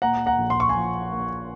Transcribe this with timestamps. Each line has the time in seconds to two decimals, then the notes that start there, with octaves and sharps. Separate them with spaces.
0.02 A#2 F#5 A#5
0.26 F#5 A#5
0.39 A#1
0.50 C6
0.60 C#6
0.69 G#5 C6
0.75 F3
1.12 A#3